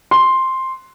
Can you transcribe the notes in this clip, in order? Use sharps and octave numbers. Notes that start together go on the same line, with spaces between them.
C6